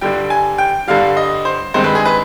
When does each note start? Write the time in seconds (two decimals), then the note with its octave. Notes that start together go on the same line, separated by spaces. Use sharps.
0.01 G2 D3 G3 G5
0.30 G#5
0.58 G5
0.88 G2 D3 G3 F5
1.17 D#5
1.45 C5
1.74 G2 D#3 G#3 C4 C5
1.84 B4
1.95 G#4
2.06 B4